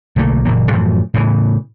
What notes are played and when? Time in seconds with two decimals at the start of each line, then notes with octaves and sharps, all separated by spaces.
0.16 B1 D3 A3 A#3
0.45 F#1 A#2 E3 A#3
0.72 F#2 A2 E3 F3
1.14 A2 C#3 E3